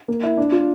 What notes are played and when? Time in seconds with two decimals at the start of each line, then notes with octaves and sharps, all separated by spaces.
0.08 A#3
0.23 E4
0.37 D4
0.52 F4